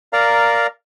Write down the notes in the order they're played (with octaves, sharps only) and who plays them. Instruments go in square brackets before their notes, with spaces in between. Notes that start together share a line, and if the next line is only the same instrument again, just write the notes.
[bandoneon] A#4 D5 F5 A#5